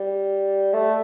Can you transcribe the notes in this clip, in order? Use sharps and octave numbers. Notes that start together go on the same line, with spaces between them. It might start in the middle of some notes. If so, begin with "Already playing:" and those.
Already playing: G3
A3